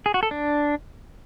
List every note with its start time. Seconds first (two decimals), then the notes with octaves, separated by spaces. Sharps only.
0.06 G#4
0.14 F#4
0.23 A4
0.31 D4